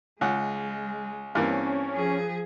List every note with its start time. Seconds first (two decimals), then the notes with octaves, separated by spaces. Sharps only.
0.21 C#2 G#3 F#5
1.35 G2 E3 A#3 C4 C#4
1.94 F3 G#4